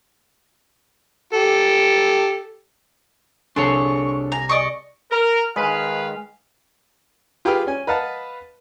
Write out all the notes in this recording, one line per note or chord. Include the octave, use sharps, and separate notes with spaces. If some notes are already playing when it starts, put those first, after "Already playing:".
G4 A4
C2 D4 G#4 A4 C#5 A5 C6 C#6
G#5 A#5
D5 D#5 C#6
A#4
D#3 G#3 B4 F5
F4 G4 G#4 B4 G5 F6
C#4 G#5
B4 D#5 F5 F#5 A5